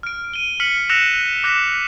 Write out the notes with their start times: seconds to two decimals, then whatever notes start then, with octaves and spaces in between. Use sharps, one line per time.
0.03 F6 D7
0.34 D#7 G7
0.60 F6 B6 C#7 F#7
0.89 E6 F#6 A#6 C#7 E7 F7
1.44 D6 F#6 A#6 B6 E7